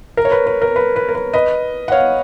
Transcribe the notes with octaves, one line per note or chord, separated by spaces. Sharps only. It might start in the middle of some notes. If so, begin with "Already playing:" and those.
A#4
C#5
B4
B4
A#4
B4
B4
A#4
B4
B4 D#5
F#5
C#5 F5